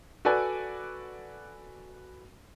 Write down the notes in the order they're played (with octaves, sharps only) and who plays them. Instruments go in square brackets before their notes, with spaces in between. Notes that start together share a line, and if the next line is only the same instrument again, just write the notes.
[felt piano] F#4 A4 B4 D5 G#5